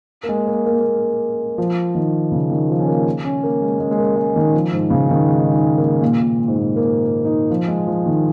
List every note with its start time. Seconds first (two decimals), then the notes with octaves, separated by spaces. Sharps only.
0.23 A#3
0.29 G#3
0.47 A#3
0.66 A#3
0.73 G#3
0.80 A#3
1.58 F3
1.95 D#3
2.32 C#3
2.51 D#3
2.69 F3
2.80 C#4
2.87 A#3
3.25 C#4
3.43 A#3
3.62 G#3
3.80 G#3
3.91 G#3
3.98 A#3
4.16 G#3
4.36 D#3
4.54 F3
4.72 G#2
4.90 C#3
5.10 D#3
5.28 G#3
5.52 D#4
5.77 A#3
6.01 A#2
6.20 A#2
6.48 G#2
6.57 A#2
6.76 A#3
7.25 D#4
7.50 F3
7.68 G#3
7.87 F3
8.06 D#3